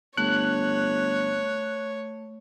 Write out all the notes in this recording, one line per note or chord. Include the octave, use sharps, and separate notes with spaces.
G1 A3 C#5 F#6